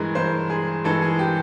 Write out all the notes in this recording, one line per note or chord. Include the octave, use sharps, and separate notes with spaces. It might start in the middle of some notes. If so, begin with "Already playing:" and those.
Already playing: G2 E3 G#3 A#4
G2 E3 G#3 C5
G#4
G2 E3 G#3 A4
G#4
G4